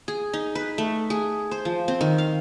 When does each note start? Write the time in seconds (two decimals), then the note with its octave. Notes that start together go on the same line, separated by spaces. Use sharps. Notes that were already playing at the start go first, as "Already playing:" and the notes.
0.08 G#4
0.34 D#4
0.55 B4
0.78 A3
1.10 G#4
1.51 C5
1.65 F3
1.88 C4
2.01 D#3
2.18 F5